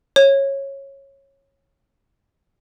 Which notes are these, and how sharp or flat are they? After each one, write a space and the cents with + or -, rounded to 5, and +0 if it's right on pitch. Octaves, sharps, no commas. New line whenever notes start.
C#5 -15